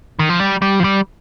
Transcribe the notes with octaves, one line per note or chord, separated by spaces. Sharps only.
D#3
F3
G3
G3
F3
G3